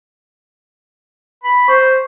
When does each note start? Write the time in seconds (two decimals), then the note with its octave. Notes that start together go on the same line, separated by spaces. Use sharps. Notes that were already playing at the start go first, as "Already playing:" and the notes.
1.44 B5
1.68 C5 C#6